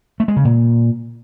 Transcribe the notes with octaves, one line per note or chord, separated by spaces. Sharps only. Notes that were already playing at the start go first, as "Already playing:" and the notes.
A3
G#3
C#3
A#2